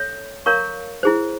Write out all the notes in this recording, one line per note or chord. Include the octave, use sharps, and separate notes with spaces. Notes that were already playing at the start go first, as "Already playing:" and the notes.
Already playing: A4 C#5 E5
A#4 C#5 F5 A#5 C#6
E4 G#4 C5